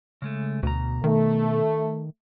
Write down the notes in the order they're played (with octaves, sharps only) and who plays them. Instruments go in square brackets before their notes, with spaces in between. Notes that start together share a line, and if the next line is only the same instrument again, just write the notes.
[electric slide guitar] C#3 G#3 A3
[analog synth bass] D2 [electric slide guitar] B2 A#5
[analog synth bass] D#3 [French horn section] A3